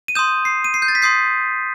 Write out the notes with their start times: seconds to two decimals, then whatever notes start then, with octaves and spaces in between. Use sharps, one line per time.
0.08 D#7
0.15 C6 D#6 G6 E7
0.45 C7
0.64 D#7
0.74 C7
0.82 G6
0.88 A6
0.95 B6
1.02 C6 D#6 G6 C7